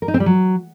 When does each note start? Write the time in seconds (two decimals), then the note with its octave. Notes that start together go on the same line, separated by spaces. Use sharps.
0.02 A#4
0.08 D#4
0.14 C4
0.20 G3
0.26 F#3